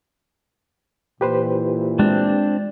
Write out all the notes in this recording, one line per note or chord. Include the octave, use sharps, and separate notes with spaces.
A#2 E3 G4 B4 C5
G#3 C4 D4